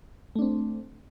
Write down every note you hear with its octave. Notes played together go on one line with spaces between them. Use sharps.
A3 C4 D4